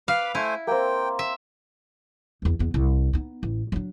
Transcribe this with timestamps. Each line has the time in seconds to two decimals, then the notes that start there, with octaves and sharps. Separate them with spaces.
0.08 B4 F5 B5 D6
0.35 A3 E4 C5 G#5
0.67 A#3 C4 G5
1.19 E5
2.42 E2 G2
2.59 E2 B3
2.74 C2
3.13 B3 D#4
3.43 A1
3.72 F#3 D4